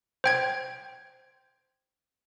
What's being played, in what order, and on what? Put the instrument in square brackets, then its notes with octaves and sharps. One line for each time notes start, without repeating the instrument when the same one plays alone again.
[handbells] C5 G5 G#6